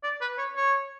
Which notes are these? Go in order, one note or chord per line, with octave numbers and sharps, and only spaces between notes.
D5
B4
C#5
C#5